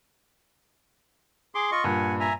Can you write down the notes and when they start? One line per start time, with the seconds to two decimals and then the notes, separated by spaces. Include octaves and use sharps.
1.55 G#4 C6 D6
1.72 F4 D#5 C#6
1.84 G2 A#2 F#5 G#5
2.20 E5 G#5 A#5